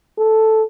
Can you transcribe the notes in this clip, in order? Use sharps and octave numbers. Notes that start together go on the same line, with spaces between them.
A4